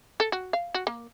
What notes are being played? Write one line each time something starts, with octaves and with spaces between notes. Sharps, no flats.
A4
F#4
F5
F#4
A#3